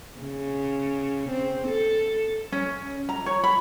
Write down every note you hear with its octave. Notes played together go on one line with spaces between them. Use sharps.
C#3
C4
A4
C#4
A#5
C#5
B5